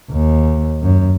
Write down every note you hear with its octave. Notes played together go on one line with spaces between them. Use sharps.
D#2
F#2